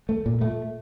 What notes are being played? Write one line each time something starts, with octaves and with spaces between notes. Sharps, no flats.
A3
A#2
A3